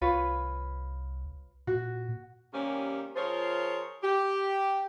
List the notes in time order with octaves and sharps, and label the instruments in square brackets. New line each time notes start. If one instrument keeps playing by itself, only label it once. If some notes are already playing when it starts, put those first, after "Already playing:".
[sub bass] C2 [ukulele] F4 B4 C#5
[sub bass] A#2 [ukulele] F#4
[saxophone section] C3 D#3 G3 A#3 C#4
F3 F4 G#4 A#4 C5 C#5
G4